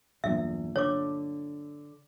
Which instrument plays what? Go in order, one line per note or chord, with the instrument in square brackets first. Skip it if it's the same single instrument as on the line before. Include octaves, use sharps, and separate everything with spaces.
[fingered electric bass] B1 G2 A#2 [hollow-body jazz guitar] E2 [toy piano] E5
[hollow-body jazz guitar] D3 [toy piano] C#5 D6